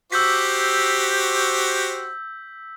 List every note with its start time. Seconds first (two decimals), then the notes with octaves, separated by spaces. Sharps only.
0.12 F#4 G4 C5 E6 G6 B6